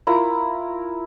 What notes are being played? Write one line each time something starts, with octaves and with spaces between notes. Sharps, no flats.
E4 F4 A#4 A#5